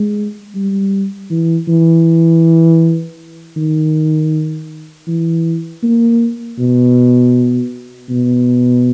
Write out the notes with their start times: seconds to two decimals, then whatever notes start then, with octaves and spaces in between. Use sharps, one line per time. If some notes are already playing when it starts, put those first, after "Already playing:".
Already playing: G#3
0.55 G3
1.30 E3
1.68 E3
3.57 D#3
5.08 E3
5.83 A#3
6.58 B2
8.10 B2